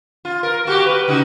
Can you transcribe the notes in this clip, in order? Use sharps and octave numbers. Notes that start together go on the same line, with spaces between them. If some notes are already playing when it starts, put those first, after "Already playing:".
F4
A#4
A#3 F#4 G4
B4
C#3 D#4 F#4